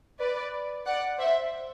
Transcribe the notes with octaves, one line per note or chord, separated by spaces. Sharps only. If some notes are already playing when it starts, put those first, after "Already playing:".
B4 D5
D5 F#5
C5 E5